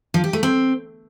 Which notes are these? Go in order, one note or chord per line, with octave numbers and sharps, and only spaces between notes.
F3
G4
A3
C4